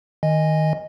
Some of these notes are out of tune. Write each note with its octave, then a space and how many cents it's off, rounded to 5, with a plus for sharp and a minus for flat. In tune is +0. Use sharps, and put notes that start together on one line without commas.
D#3 +0 D#5 +0 G#5 -15